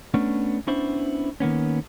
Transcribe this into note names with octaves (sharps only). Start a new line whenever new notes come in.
A3 B3 C#4 D4
B3 C#4 D4 E4 C5
D#3 A#3 B3 C#4